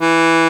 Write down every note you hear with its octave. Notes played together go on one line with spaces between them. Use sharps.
E3